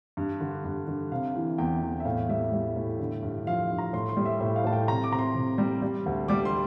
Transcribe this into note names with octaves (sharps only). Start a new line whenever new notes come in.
G2
D3
G2
D3
C3 F5
E3
E2 G5
E2
E5
A2 F5
G3 E5
G3
A2
D3
G2
F3 F5
G2
A#5
A2 C6
C6
G3
E5
A2 E5
F5
A2 A5
G5
C3 A#5
D6
C3 A#5
C6
C3
G3
G3
D2
G3 D6
C6